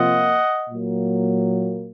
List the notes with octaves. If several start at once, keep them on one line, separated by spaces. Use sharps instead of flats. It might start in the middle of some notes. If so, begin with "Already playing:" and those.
Already playing: C3 F3 A#3 F4 D#5 F#5
A#2 F#3 A#3